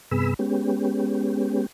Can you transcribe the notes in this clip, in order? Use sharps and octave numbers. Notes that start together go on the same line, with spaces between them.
G2 C3 B3 G#4 B5 E6
G#3 B3 C#4 G4